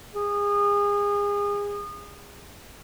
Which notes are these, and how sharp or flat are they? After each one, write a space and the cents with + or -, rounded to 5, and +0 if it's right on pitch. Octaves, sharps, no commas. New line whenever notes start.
G#4 -30